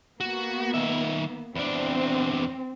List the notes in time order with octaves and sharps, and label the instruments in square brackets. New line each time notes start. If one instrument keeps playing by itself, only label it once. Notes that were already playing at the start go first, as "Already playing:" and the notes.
[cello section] A#3 B3 [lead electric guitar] F#4
[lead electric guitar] D#3 E5
[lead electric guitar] E2 D4 [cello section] C4